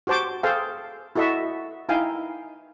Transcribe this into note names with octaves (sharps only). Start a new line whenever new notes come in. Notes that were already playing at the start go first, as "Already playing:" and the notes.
F#4 G4 C5 A5 D6
G#4 A4 C5 F5 G5 A5
E4 F#4 A4 D#5 E5 F#5
D#4 E4 F5 G5 G#5